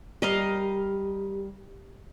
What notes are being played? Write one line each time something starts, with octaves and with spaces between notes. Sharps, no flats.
G3 G4 A#4 D#5 F5